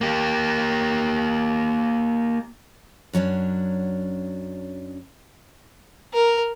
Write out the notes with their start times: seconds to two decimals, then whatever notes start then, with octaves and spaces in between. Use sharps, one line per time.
0.01 A#3 G4
3.13 F#2 F#3 C#4 D4
6.14 A#4